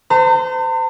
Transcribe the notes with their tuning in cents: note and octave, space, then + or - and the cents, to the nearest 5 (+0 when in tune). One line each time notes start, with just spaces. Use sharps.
C5 -35 A#5 -45